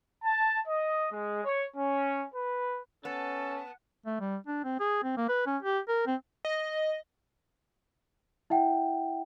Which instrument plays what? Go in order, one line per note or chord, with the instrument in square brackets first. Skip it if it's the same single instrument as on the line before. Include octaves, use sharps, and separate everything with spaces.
[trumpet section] A5
D#5
G#3
C#5
C#4
B4
[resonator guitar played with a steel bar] B3 [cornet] C#4 [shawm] A4 [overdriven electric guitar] A5
[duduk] A3
G3
D4
C4
G#4
C4
A#3
B4
C#4
G4
A#4
C4
[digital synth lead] D#5
[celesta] E4 E5 F#5 G5